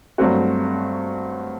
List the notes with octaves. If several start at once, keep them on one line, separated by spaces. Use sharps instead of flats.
G2 F#3 A3 C4 F#4